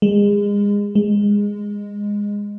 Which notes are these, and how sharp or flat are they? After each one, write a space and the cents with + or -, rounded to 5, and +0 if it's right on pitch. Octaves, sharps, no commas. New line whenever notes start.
G#3 -30
G#3 -15